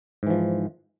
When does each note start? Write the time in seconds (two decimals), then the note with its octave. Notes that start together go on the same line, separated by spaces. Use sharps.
0.23 G#2
0.27 E3
0.30 F3